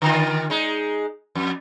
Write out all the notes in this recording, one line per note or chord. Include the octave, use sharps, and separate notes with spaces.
D3 D#3 F4
G#3 D#4
F2